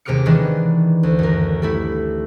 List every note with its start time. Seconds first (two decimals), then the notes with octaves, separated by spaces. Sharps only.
0.05 D#2 C3 G#3 D6 F6 C#7
0.26 D#3 E3 G#3 B3 D4
1.03 D2
1.19 F#2 A#4
1.62 G3 A3 E4